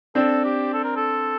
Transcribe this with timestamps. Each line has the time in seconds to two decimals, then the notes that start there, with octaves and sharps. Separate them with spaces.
0.15 C4 D4 A4
0.44 G4
0.73 A4
0.84 A#4
0.96 A4